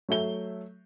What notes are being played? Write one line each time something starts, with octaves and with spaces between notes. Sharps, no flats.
F#3 A3 E5 G7